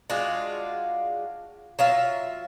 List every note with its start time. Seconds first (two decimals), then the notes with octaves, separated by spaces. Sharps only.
0.10 G#3 D4 F4 F#4
1.79 F#3 F4 E5